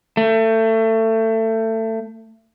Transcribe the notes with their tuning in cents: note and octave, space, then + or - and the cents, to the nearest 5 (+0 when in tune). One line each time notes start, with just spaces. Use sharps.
A3 +25